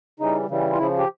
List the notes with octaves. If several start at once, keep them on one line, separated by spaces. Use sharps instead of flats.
C#3 E3 G3 D#4
C#3 E3 G3
F4
C#3 F3 E4
G4